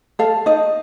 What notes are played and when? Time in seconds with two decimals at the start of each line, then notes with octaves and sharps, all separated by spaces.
0.19 A4 F5
0.46 D#4 D#5